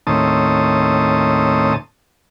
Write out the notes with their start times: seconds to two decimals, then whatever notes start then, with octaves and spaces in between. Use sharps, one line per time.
0.07 D#2 A2 C4 C#4 A5 D#6